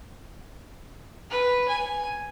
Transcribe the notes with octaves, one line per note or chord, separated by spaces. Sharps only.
B4
G#5